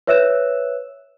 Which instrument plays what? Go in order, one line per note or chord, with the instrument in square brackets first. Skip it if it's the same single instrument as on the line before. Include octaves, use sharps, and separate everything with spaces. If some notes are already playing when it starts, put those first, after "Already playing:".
[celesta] B4 C#5 E5 E6 F#6 E7